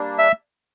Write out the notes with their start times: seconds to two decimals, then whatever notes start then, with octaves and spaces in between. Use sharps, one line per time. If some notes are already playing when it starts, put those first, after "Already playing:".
Already playing: G3 A#3 D4
0.19 E5